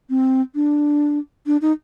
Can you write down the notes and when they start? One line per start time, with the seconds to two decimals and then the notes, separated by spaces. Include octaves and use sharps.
0.10 C4
0.55 D4
1.46 D4
1.62 D#4